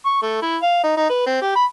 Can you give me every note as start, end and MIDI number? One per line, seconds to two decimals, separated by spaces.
0.06 0.19 85
0.22 0.38 57
0.42 0.56 64
0.62 0.78 77
0.84 0.93 63
0.97 1.09 63
1.10 1.26 71
1.27 1.40 60
1.42 1.55 67
1.56 1.65 83